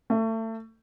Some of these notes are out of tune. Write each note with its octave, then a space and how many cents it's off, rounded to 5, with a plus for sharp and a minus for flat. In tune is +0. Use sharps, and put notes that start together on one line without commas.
A3 +30